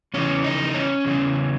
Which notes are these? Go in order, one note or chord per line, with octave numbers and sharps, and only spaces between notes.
E2 C#3 E3 C#4
D#4
C#4
E2 C#3 E3